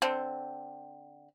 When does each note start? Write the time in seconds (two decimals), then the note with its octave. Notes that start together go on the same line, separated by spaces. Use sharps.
0.02 D3 C4